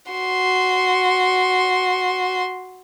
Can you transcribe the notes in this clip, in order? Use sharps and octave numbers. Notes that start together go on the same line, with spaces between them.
F#4 C6